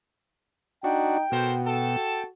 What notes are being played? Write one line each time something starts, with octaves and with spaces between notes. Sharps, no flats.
D4 D#4 F#4 G5
B2 F#4 A4 A#4 C5
A4 G5 A5